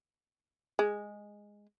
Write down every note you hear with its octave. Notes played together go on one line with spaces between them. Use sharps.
G#3